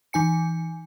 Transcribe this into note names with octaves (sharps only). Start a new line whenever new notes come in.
E3 D#4 G#5 C#7